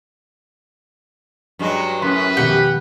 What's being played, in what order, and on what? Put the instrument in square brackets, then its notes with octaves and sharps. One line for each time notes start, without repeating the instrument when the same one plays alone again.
[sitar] G2 F#3 G#3
[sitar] F#2 A2 C#4 [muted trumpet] B4 [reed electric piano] C6
[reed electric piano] F2 B2 D#3 [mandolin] G4 F#5